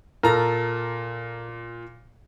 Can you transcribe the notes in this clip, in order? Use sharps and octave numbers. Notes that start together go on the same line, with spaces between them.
A#2 A4 A#4 A#5